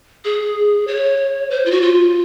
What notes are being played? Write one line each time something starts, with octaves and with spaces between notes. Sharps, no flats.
G#4
C#5
C5
F4
F#4
F4